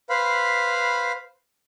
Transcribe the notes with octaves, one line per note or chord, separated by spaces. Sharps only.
B4 C5 F5 B5